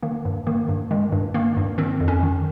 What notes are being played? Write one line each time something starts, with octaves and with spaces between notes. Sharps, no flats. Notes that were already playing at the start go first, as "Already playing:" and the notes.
D#3 A#3
G2
D#3 A#3
G2
D#3 G#3
G2
D#3 A#3
G2
D#3 C4
F2
C#4
D#3